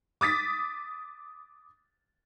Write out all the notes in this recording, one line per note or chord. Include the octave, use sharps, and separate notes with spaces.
D6 D#6 A6 B6